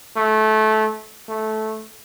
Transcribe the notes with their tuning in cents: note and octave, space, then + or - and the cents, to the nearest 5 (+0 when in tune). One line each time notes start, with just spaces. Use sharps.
A3 -20
A3 -10